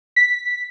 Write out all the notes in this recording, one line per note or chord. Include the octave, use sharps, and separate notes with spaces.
B6